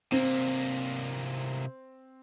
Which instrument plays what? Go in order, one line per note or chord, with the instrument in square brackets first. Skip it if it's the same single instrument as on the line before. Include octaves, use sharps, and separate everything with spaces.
[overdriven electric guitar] C3 A#3 [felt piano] C4